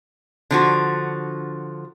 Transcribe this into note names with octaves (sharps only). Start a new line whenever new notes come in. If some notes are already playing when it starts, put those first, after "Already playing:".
D3 F3 F#4